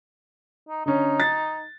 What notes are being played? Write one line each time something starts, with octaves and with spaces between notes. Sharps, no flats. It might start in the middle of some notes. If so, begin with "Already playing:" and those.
D#4
D3 C#4 D#4
A6